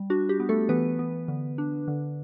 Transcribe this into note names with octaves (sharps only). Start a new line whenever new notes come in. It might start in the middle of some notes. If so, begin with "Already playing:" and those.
Already playing: G3
D4 F#4
G4
B3
A3 A4
E3 B3 B4
B3
D3
D4
D3